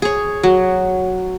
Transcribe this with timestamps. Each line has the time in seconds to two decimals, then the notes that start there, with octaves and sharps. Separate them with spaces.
0.02 G#4 C#5
0.43 F#3